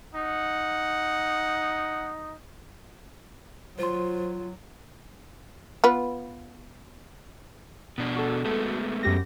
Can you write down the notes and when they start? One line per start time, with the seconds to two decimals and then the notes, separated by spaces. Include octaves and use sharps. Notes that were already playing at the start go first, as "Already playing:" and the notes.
0.15 D#4 F#5
3.79 F#3 F4 C5 C6
5.84 B3 F4 B4
7.98 B2 D4
8.16 F#4 A4
8.45 G#3 A3 B3
9.03 F#2 G4 A#6